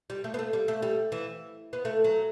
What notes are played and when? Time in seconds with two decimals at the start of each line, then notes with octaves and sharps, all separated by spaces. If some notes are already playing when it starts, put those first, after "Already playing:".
0.10 G3
0.24 A3
0.34 B3
0.39 A3
0.53 G3
0.68 A3
0.82 G3
1.12 E3
1.73 B3
1.85 A3
2.04 F#3